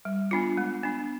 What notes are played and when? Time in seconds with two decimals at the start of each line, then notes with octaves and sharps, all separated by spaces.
0.05 G3
0.31 B3 D4 F4
0.57 G#3
0.83 B3 D4